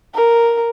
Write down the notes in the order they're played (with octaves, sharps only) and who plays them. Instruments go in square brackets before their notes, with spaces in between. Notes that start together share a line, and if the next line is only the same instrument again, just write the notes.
[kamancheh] A#4